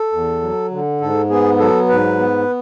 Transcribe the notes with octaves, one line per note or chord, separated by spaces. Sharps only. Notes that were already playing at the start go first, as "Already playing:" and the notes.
Already playing: A4
E2
F#3
D3
G#2 A4
B3 G#4
F#3 A4
G#2 B4
B3